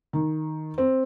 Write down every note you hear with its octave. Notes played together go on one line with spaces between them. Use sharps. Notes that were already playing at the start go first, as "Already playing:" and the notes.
D#3
C4